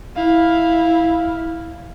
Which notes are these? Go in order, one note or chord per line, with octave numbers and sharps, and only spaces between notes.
E4 F5